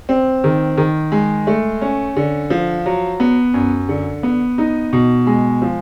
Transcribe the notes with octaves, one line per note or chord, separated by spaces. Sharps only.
C4
D#3
D#3
G#3
A3
C#4
D3
F3
F#3
B3
F#2
D3
B3
D#4
B2
G#3
F3